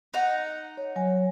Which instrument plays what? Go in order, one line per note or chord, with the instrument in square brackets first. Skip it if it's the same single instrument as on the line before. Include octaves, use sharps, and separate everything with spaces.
[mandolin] D#4 F#5
[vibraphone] C#5
F#3 C#5 G#5